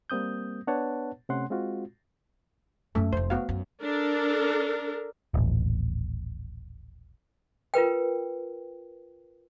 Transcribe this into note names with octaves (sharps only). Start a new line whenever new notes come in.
G3 A#3 C4 D#6 G6
B3 D4 B4 C#5 F#5 A5
C3 A3 C#4 F#5 C6
G#3 C4 F4 F#4
F#2 A3 A#3
F1 F2 C5
B3 F#4 F5
F#2
D4 A4 A#4
D#1 A1
F4 A#4 B4 G5